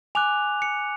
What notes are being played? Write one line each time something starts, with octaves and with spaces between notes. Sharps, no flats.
G#5 D6 F#6 F7
C#7